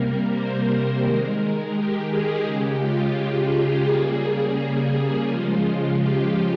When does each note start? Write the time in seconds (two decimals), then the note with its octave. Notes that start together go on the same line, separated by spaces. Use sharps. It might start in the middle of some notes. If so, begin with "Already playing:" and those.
Already playing: C3 G3 A#3 A#4
0.31 C5
0.68 A#4
1.02 D#3 G#3
1.73 G4
2.09 G#4
2.44 C#3 G#3 G4
2.79 F4
3.15 G4
3.50 G#4
3.86 C#3 G3 A#3 G#4
5.28 C#3 F3 G#3 F4
5.99 G4